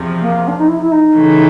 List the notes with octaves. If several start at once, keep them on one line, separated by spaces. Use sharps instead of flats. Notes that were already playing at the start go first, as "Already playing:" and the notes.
Already playing: E2 C3 F3
A#3
D4
D#4
E4
E4
D#4
C#3 E3 A3